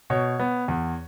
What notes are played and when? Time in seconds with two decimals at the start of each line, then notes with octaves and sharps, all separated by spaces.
0.10 B2 C#5
0.39 B3
0.68 E2